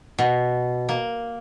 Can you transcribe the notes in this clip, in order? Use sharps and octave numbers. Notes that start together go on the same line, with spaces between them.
B2
A#3